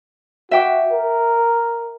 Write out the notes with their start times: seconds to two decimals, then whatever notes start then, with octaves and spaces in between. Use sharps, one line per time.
0.51 F#4 E5 G5 D6
0.92 A#4